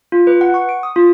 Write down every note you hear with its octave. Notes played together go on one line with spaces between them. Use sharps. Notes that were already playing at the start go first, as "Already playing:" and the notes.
F4
B4
F#5
C#6
D7
D#6
F4